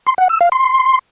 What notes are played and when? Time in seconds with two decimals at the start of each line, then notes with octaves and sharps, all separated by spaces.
0.07 C6
0.18 F#5
0.29 E6
0.41 F5
0.52 C6